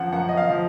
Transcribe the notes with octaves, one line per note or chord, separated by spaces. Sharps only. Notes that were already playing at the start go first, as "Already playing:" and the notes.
Already playing: F#2 F3 F#5
F#2 F#5
D#5
F5
F3